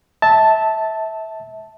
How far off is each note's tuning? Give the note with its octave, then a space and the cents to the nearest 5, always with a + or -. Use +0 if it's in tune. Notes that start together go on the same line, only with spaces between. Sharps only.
E5 -25 A5 +0